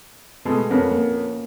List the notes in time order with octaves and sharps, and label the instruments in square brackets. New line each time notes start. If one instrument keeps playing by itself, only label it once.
[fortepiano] B2 G#3 A3 [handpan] B3
[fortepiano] F2 B3 A#4 [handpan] C#4
[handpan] A#3